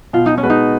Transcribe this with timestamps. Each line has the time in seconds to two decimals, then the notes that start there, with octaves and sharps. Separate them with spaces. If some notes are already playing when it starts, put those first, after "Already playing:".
0.13 B2 F4
0.26 D#4
0.38 C#4
0.43 G#3 B3 F#4 B4
0.50 D#4